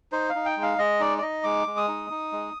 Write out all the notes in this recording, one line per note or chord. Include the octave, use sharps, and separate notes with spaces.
D#4 C5
F5
D#4
G5
G#3
F5
G#3 D#5
D#4 D5
D5
D#4 D#5
G#3 D6
G#3
D#6
D#4
D#4
G#3